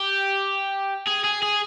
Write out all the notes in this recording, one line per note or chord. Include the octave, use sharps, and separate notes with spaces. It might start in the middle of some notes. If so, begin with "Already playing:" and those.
Already playing: G4
G#4
G#4
G#4